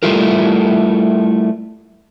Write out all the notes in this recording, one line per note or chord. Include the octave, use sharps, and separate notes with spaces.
G3 A3 E4 F4 A#4